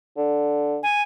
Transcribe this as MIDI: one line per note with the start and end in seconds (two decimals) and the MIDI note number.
0.18 0.78 50
0.83 1.02 80